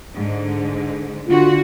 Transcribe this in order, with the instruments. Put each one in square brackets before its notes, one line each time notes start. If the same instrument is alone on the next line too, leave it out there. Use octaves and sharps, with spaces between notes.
[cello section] G#2 D3
[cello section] D3 F#4 [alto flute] F4